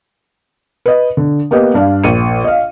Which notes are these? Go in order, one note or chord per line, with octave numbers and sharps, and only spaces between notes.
B4 D#5
D3
A#3 B3 G4 D#5
G2 D4 F5
A#1 C#7 D#7
D#5 F5